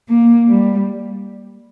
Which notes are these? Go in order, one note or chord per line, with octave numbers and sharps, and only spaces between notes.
A#3
G3